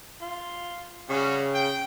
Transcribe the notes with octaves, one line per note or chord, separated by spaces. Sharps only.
F4
C#3 G3 C#4 F#4
G5